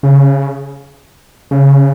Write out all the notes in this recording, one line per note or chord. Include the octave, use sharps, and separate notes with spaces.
C#3
C#3